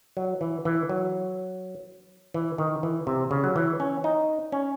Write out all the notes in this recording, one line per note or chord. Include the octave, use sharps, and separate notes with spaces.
F#3
E3
E3
F#3
E3
D#3
E3
C3
C#3
F#3
E3
C#4
D#4
C#4